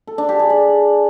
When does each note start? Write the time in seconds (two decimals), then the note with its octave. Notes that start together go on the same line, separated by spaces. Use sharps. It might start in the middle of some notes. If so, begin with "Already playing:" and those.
0.07 A4
0.18 D4
0.29 G4
0.39 G#4
0.50 D5